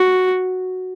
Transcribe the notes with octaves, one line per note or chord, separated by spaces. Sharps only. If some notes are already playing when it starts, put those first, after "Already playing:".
Already playing: F#4